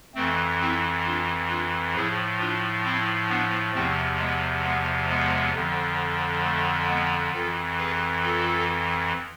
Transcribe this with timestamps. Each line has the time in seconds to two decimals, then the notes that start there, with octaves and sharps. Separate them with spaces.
0.15 F2 E3 A3 C4
0.60 C4 E4
1.05 D4 F4
1.49 D4 F4
1.94 A2 F3 E4 G#4
2.39 D4 F4
2.84 C4 E4
3.29 B3 D4
3.74 E2 C3 F3 A3 C4
4.19 G#3 B3
4.64 G#3 B3
5.08 G#3 B3
5.53 F2 D3 F3
6.44 A3
6.88 G#3 B3
7.33 F2 E3 F4 A4
7.78 G#4 B4
8.23 F4 A4